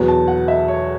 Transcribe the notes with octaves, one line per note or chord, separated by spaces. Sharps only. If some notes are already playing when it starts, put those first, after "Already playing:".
Already playing: E2 B2 F#3 B3
A5
F#5
E5
C#5